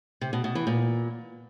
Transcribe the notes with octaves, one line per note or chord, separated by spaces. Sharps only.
C3
B2
B2
E3
A#2